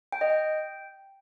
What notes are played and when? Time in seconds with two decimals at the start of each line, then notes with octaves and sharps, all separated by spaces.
0.12 G5
0.21 D#5
0.30 G5